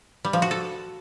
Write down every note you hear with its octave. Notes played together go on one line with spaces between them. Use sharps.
G3
F3
F#4
A4